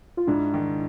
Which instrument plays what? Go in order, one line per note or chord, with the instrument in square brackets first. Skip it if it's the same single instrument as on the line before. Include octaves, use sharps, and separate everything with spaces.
[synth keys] F4
[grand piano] G#2 [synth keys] D4 E4
[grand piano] D#3